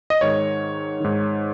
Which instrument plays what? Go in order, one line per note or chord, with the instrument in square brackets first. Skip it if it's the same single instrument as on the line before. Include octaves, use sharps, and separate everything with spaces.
[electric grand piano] D#5
G#2 D#3 C#5
G#2 D#3